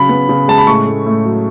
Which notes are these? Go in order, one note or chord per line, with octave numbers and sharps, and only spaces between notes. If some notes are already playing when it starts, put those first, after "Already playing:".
Already playing: C#3 F#3 B5
B3
C#3
G#3 A5
B5
A2 C#6
A3
A2
F#3